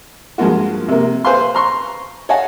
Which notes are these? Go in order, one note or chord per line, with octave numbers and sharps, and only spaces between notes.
G2 F3 G#3 A#3 F4 F#4
C3 A#3
B4 C5 F5 G#5 C6
A#5 C6 C#6
C#5 D#5 F5 F#5 G#5 A5